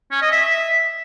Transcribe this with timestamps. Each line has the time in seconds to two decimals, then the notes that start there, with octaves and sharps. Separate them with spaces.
0.11 C#4
0.21 D#5
0.32 E5